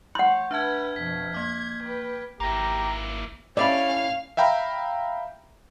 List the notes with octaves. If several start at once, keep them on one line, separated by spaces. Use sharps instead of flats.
A3 C#5 F#5 C6 G6
D4 B4 E5 A5 F6 G#6
F2 B2 B6
A#3 D6 G#6
B4 G5
G#1 A#3 E4 G4 A#5
A2 C#4 D5 E5 F5 B5
E5 F5 G5 A#5 B5